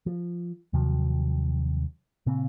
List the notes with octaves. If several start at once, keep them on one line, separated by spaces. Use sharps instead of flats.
F3
D#2 C3 F3 F#3
A#2 C#3 A#3 C4